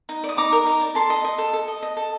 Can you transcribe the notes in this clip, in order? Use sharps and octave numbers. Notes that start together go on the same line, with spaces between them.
D#4
D5
D#6
D#4 A#5 D6
A#4
D#4
D5
A4 A5 C6
D#5
D#5
A4
A4
D#5
D#5
A4